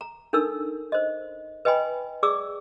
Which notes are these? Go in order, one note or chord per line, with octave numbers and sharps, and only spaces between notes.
A#5
D4 D#4 A4 A#4 E6
C5 D#5
B4 D#5 G5 G#5 B5
G#4 D5 D6 E6